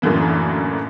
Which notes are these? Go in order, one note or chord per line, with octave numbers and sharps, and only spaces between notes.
F#2 A2 D3 E3 A#3